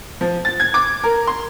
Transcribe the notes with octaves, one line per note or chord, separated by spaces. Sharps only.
F3
A6
G#6
D6
A#4
C6